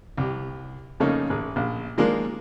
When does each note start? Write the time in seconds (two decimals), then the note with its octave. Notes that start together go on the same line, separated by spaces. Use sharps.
0.17 C2 G4
1.00 F2 C#3 A3 A#3 C#4 D#4
1.30 A1 G#4
1.56 A#1
1.97 D#3 F3 G#3 A#3 D4 A#4